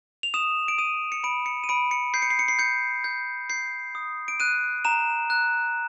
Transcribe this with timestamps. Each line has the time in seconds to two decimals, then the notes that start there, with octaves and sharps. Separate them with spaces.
0.23 F7
0.34 D#6 E7
0.68 D7
0.78 D#6 D#7
1.12 C#7
1.24 B5 D7
1.46 C#7
1.64 D#7
1.69 B5 D7
1.91 C#7
2.14 G6 C7
2.22 C#7
2.30 C7
2.39 C#7
2.48 C7
2.59 G6 C#7
3.04 G6
3.50 G6 C7
3.95 D#6
4.28 D7
4.40 F#6 D#7
4.85 A#5 E7
5.30 F#6